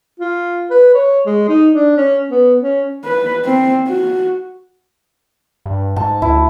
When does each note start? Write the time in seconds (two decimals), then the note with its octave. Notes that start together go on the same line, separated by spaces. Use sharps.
0.20 F4
0.70 B4
0.94 C#5
1.26 G#3
1.48 D#4
1.73 D4
1.97 C#4
2.31 B3
2.62 C#4
3.05 B4
3.45 C4
3.87 F#4
5.66 G2
5.96 G#2 A5
6.22 D2 E4